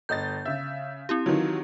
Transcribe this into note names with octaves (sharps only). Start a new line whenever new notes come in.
G1 D#5 G6 A6
C#3 E5
C4 E4 G4
D#3 E3 F#3